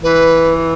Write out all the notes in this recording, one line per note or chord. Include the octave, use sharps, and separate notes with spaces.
E3 B4